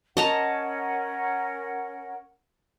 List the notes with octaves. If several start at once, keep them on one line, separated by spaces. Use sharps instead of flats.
C#4 A#4 D#5 F#5 A5 A#5